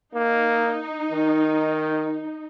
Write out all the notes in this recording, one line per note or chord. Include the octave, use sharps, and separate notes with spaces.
A#3 D#4
D#3